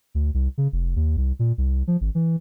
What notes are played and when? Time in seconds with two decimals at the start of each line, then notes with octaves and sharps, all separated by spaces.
0.15 D2
0.34 C2
0.58 C#3
0.72 F1
0.96 D#2
1.17 C2
1.39 A#2
1.58 C2
1.87 F3
2.01 G#1
2.15 E3